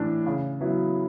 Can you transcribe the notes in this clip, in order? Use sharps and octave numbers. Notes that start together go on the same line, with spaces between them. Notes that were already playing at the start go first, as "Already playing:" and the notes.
Already playing: A2 E3 A3 D4
C#3
F#3 B3 E4